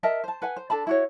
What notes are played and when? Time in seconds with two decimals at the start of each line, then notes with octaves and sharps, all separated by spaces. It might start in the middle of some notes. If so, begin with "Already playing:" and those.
0.03 A#4 D#5 E5 A5
0.24 C5 A5
0.42 B4 F#5 G#5
0.56 C5
0.70 D4 A4 A5 B5
0.87 E4 F#4 C#5